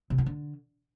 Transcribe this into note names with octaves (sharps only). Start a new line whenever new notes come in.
C3
E3
D3